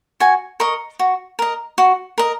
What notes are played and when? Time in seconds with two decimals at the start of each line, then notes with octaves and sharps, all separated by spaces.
0.20 F#4 G#5
0.60 A#4 D#5 C#6
0.99 F#4
1.39 A#4 D#5
1.78 F#4
2.18 A#4 D#5